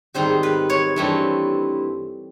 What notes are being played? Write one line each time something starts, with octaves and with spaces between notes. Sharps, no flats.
G#2 D#3 G3 C4 C5
B4
C#5
G2 E3 A3 C4